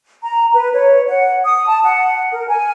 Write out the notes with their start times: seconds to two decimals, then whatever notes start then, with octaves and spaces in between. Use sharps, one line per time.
0.23 A#5
0.53 B4
0.74 C#5
1.07 F#5
1.44 D#6
1.67 A5
1.83 F#5
2.32 A#4
2.48 G#5